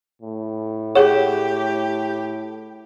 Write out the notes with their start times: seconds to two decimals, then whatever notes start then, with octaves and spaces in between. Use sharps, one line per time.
0.22 A2
0.95 G4 G#4 C#5 F#5